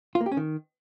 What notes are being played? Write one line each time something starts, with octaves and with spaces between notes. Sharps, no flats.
F4
A#3
G4
C#4
D#3